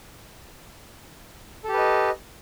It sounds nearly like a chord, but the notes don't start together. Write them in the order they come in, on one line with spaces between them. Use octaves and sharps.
A4 G4 B4 D#5